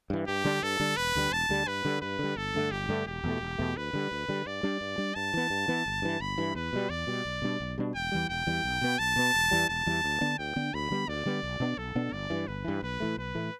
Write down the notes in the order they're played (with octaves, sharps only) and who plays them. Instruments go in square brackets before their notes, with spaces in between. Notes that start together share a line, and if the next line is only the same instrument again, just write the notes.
[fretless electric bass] G2 E3
[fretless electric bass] G2 [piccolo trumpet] G4
[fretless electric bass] D3 G3 D4
[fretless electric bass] G2 [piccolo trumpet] A4
[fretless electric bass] D3 G3 D4
[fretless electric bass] E1 [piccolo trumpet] B4
[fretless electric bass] D2 D3 G3
[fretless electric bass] E1 [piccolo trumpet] A5
[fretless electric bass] D2 D3 G3
[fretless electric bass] G2 [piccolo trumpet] B4
[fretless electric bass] D3 G3
[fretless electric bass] G2 [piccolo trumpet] B4
[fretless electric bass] D3 G3
[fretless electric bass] G1 [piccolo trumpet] A4
[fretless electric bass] G2 D3 A3
[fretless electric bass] G1 [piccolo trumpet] G4
[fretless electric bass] G2 D3 A3
[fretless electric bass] E1 [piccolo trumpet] G4
[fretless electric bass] E2 B2 A3
E1
E2 B2 A3
[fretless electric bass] D2 [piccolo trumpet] B4
[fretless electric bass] D3 G3
D2
D3 G3
[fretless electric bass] G2 [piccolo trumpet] D5
[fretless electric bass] G3 D4
G2
G3 D4
[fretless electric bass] G2 [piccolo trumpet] A5
[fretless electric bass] E3 B3
G2
E3 B3
G1
G2 E3
[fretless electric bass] G1 [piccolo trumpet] B5
[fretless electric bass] G2 E3
[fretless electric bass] E2 [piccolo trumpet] B4
[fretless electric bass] B2 G3
[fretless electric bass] E2 [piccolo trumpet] D5
[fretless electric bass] B2 G3
B1
B2 G3 D4
B1
B2 G3 D4
[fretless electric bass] E1 [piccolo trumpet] G5
[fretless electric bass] E2 E3 G3
[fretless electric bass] E1 [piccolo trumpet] G5
[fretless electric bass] E2 E3 G3
B1
B2 B3
[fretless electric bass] B1 [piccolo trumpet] A5
[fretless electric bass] B2 B3
E1
E2 E3 G3
[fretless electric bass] E1 [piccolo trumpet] A5
[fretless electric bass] E2 E3 G3
D2
D3 B3 D4
[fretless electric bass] D2 [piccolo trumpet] G5
[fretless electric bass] D3 B3 D4
[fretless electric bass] D2 [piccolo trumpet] B5
[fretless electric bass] D3 G3 B3
[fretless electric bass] D2 [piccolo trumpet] D5
[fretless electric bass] D3 G3 B3
B1
B2 B3 D4
[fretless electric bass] B1 [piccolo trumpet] A4
[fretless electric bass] B2 B3 D4
[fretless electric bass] G1 [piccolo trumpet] D5
[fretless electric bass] G2 E3
[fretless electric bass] G1 [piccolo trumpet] B4
[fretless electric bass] G2 E3
[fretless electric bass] B1 [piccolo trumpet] B4
[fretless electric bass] A2 E3 A3
[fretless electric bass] B1 [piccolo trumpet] B4
[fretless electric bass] A2 E3 A3